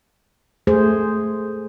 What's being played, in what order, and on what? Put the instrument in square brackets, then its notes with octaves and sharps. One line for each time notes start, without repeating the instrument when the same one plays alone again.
[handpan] A3 G#4 C5